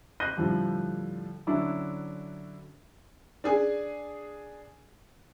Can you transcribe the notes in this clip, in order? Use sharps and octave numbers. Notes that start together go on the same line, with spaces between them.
F#6 G6 A#6 C7 D#7 G7
A2 D3 F3 G3
D3 F#3 C#4 D4 E4
D4 G#4 G#5